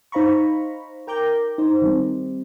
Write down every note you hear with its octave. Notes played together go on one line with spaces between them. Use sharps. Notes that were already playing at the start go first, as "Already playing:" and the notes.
D#4 C5 F5 A#5 B5 C#6
A#4 G5 A#5 D6 G6
D#4 C5
D#3 G3 C4